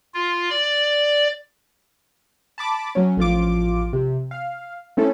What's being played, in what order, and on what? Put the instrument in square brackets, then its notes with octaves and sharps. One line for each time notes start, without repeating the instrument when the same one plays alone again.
[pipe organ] F4
D5
[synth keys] A5 B5 D6
F#3 C#4
A1 F3 F4 D6
C3
F5
A3 C4 C#4 E4 A4